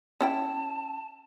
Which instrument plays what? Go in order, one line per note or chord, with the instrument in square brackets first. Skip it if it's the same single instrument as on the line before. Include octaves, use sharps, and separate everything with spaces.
[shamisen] C#4 E4 G5 [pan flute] A5